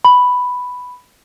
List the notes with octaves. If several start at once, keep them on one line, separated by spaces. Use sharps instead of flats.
B5